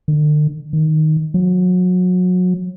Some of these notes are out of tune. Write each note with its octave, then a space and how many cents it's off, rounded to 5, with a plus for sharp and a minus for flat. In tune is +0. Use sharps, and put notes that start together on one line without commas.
D3 +40
D#3 +0
F#3 -30